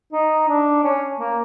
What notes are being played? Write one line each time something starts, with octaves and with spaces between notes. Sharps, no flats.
D#4
D4
C#4
A#3